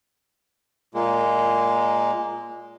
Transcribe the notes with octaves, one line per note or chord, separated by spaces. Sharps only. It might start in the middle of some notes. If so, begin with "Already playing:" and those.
A#2 G#3 A#3